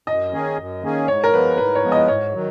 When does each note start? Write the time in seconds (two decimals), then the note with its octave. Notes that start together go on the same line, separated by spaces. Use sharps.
0.07 F#2 D#5
0.33 D#3 A#3 C#4 G#4
0.58 F#2
0.83 D#3 A#3 C#4 G#4
1.08 G#2 C#5
1.24 A#4
1.33 F3 G#3 B3 B4
1.58 G#2 B4
1.75 C#5
1.83 F3 G#3 B3
1.92 D#5
2.08 G#2 C#5
2.34 D#3 F#3